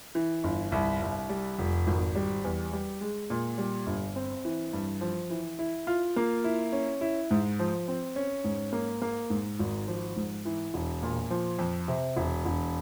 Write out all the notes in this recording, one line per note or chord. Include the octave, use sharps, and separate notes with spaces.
E3
G1
C2
C2
G3
F1
G#1
G3
E2
G3
G#3
A#2
G3
G1
C4
E3
G2
F3
E3
E4
F4
A#3
E4
C#4
E4
G#2
F3
C4
C#4
G#2
A#3
A#3
G#2
G#1
F3
G#2
E3
E1
A#2
F3
F2
C3
E1
E1